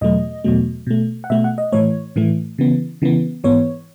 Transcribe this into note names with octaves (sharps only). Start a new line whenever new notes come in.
E2 B2 F#3 A3 D#5
E2 B2 F#3 A3
B2 A3
F#5
B2 A3 E5
F#5
D#5
A2 E3 A3 C#5
A2 E3 A3
C#3 E3 B3
C#3 E3 B3
G#2 E3 B3 C#5